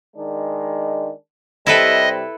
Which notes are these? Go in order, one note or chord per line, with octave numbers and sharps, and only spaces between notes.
D#3 G#3 D4
C3 G3 C4 E4 A4 B4 D#5